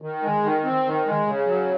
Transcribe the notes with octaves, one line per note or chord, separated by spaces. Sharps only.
D#3
G#3
D#3
C4
D#3
G#3
C#3
F#3